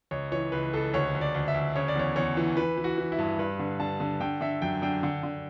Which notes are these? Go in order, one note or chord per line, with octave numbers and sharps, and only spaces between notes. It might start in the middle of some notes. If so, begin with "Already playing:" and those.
C#2 C#5
E3 C#5
C#2 B4
C#2 A4
D2 C#5
D2
D5
D2
E5
D2
C#3 C#5
D5
E2 C#5
E2 C#5
E3
E3 B4
E3
F#4
E3
E4
G2
G2 B4
D3
D3 A5
D3
D3 G5
D3 E5
F#2 G5
D3 G5
D3
D3